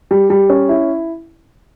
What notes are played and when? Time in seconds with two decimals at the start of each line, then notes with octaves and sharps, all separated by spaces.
0.11 G3
0.30 G3
0.50 C#4
0.69 E4